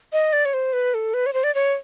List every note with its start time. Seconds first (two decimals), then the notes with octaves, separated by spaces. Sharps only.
0.13 D#5
0.33 D5
0.45 C#5
0.54 C5
0.73 B4
0.94 A4
1.14 B4
1.26 C#5
1.34 C5
1.44 D5
1.55 C#5